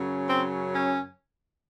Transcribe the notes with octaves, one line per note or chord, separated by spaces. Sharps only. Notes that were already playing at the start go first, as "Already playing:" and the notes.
Already playing: F#2 C#3 F#3
C4
C#4